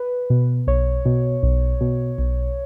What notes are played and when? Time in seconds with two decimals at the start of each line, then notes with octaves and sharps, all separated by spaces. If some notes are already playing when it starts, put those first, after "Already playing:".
Already playing: B4
0.30 B2
0.67 B1 C#5
1.05 B2
1.43 B1
1.81 B2
2.18 B1